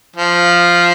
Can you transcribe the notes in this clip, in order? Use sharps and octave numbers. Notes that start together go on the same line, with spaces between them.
F3